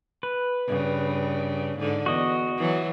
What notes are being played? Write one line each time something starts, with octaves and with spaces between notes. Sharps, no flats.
B4
G2 C#3
G#2 D3
E2 F#4 D#5
E3 F#3